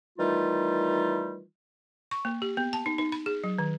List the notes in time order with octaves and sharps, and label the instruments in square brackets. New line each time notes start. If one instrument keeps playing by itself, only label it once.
[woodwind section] D#3 E3 G3 A3 D#4 F4
[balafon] C#6
A#3
G4
B3
A5
D#4
D#4
B5
G#4
F#3
D#3